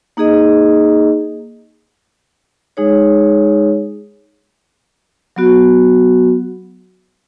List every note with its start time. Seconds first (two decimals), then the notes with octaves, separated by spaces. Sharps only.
0.17 A#3 D#4 G#4 D#5
2.77 G#3 D#4 G#4 C#5
5.36 F#3 B3 F#4